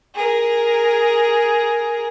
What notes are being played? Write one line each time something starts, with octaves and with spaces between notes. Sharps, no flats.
G#4 A#4